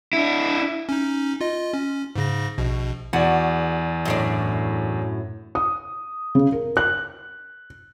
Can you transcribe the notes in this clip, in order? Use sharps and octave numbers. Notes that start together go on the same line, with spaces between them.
D4 E4
C#4 D#4
F4 D#5
C#4
G#2 C#3 A#6
A#1 B2
E2 F#4 D5
F#2 A2 D4
D#6
C#3
A#4
F#6